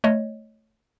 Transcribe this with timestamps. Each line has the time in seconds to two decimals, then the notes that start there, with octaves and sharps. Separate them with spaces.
0.04 A3 C#5 D#5